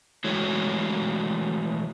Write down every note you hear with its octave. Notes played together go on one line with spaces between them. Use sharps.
E3 G#3 A3 E4 F#4 C#5